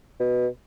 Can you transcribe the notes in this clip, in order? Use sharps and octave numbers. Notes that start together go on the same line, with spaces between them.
B2